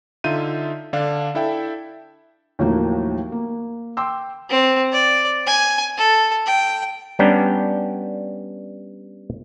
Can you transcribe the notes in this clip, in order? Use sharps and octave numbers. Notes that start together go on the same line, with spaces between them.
D3 D#4 F4 E5 G6 D#7
D3 D4 F5
D4 E4 A4 E5 G5
D#2 A2 F3 F#3 A3 A#3
A#3
G5 C6 D6 E6
C4
D5
G#5
A4
G5
G3 B3 C#4 D4 G5 A#5